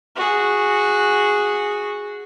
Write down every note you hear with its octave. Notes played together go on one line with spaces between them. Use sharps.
F#4 G#4